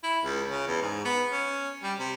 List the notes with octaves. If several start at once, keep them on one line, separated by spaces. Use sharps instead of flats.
E4
C#2
C#3
E2
G#2
B3
C#4
G3
C3